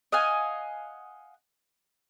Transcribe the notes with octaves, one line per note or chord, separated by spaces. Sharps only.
D#5 F5 F#5 G#5